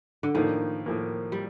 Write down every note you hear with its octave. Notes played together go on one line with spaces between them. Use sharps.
D3
A2 D#3 F3 A#3
A2 F3 A#3
G3